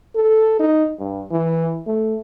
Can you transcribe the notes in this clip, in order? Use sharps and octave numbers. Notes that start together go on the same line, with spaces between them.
A4
D#4
G2
E3
A3